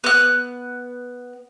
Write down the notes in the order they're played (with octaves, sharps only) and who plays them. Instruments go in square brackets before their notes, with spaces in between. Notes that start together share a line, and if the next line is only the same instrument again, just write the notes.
[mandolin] B3 F#6